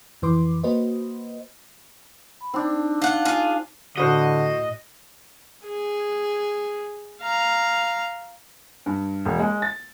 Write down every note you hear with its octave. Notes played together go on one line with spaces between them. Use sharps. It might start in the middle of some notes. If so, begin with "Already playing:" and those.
F2 E3 B4 C6 D6
A#3 F#4 B4 C5 D#5
B5
C4 D4 D#4
F4 F#5
F4 G#4
A2 D3 F#4 C5 D#5 F#6
G#4
F5 A#5
G2
E1
G#3
A6